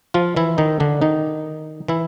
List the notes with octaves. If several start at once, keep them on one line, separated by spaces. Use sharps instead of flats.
F3 F4
E3 E4
D#3 D#4
D3 D4
D#3 D#4
E3 E4